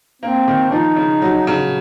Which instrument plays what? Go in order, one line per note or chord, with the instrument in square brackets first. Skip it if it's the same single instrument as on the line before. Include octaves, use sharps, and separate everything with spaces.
[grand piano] A#3 [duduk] C4
[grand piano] D#3
[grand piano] F3 [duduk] D#4
[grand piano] C#3
F#3
C#3